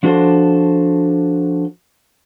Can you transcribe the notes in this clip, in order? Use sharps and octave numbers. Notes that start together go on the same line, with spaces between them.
F3 D4 F#4 A4 C5